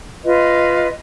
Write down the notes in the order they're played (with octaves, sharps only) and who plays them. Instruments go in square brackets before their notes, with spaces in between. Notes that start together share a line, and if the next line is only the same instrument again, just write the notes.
[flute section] F4 B4 D#5